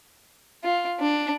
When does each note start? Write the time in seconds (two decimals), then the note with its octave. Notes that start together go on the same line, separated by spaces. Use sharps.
0.64 F4
1.00 D4